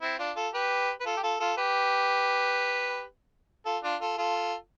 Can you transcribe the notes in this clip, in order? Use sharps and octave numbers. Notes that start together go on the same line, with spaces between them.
C4 E4
D4 F4
F4 A4
G4 B4
B4
F4 A4
G4
F4 A4
F4 A4
G4 B4
F4 A4
D4 F4
F4 A4
F4 A4